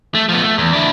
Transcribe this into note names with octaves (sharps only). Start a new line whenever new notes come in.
A3
F3 B3
A3
E2
D4 E4